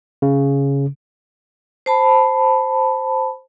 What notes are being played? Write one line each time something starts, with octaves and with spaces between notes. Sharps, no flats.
C#3
C5 A5 B5